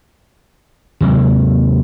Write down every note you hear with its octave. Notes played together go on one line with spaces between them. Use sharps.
D#2 C3 F#3 G#3